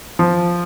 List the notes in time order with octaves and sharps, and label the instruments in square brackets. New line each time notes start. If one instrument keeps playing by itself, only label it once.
[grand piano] F3